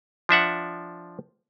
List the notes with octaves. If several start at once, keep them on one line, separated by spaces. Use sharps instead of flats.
F3 D4 E5 F#5